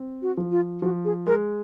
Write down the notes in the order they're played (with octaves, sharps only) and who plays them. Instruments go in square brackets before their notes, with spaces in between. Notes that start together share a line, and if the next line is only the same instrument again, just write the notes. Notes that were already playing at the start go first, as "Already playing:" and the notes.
Already playing: [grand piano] C4
[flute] F#4
[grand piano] F3
[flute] F4
[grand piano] F3 [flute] F#4
[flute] G#4
[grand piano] G#3 [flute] A#4